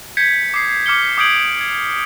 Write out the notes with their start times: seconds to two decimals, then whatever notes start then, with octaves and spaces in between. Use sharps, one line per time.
0.17 G6 G#6 B6 C#7
0.54 D6 D#6 C7
0.86 D6 F6 C#7 G7
1.17 D6 D#6 G6 G#6 D7 F#7
1.61 G#6